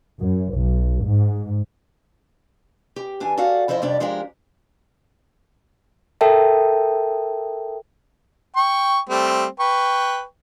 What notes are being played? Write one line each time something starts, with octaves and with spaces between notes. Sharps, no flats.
F#2
B1
G#2
G4
E2 D4 G#5
F#4 A4 D5 F5 F#5
F2 F3 E4 C5 D#5
F2 C3 G3 D4 D5
F3 G#3 D4 G4 A#4
A4 A#4 E5 G5 A5
G5 C#6
G3 A3 C4
B4 G5 C#6